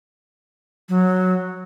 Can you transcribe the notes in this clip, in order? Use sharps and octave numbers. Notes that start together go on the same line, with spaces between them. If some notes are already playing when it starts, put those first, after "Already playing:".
F#3